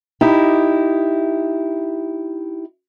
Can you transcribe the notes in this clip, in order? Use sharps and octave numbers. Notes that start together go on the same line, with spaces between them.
D#4 E4 G4